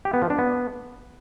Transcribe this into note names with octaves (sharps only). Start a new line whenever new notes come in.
G4
B3
F3
D4
B3